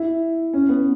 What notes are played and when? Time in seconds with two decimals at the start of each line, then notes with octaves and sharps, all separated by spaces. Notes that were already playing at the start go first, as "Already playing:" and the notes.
Already playing: E4
0.53 C#4
0.69 B3